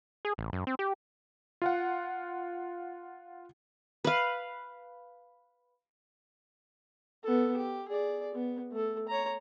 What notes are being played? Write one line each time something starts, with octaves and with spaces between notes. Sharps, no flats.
G#4
A1
F#2
C4
G4
F4 F5 F#5
B4 F5
B3 A4
G4
G#4 D5
B3
A3 A4
C#5 A#5